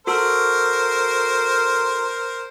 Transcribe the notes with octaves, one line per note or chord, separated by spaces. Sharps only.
F#4 A4 A#4 C5